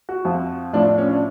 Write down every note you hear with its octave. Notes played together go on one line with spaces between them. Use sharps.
F#4
F2 F3
A2 F3 D4
D4
C#4
D4